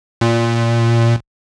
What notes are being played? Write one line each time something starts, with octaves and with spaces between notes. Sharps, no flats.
A#2